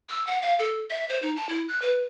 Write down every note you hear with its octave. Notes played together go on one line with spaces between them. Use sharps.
E6
F#5
F5
A4
E5
C5
D#4
A5
E4
F#6
B4